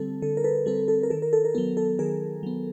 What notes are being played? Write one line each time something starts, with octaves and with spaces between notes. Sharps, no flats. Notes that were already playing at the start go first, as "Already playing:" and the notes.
Already playing: D3 G3 C4 A4
D3 A4
A#4
A4 B4
G3 C4 A4
A4
A#4
D#3 A4
A#4
A4
A#4
F#3 B3 A4
A4
D#3 G#4 A#4
F#3 B3